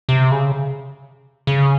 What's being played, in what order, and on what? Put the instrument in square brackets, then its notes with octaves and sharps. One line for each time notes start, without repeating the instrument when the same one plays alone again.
[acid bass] C3
C#3
C#3